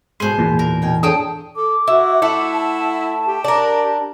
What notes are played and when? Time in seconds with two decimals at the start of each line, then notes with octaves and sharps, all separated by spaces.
0.20 G#2 B2 G#4 C5 C6
0.39 E2 A#2 E3
0.59 A#4
0.82 B2 G5 G#5
1.03 D4 G#4 A4 C#5 G5 A5 D#6
1.56 A4 D6
1.88 E4 F#4
2.22 A3 E4 F#5
2.54 A5
3.27 G4
3.44 D4 A#4